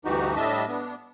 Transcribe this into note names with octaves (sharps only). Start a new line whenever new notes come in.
D2 G2 E3 D#4 F#4 G4
A2 G3 D4 D#5 E5 A5
B3 D4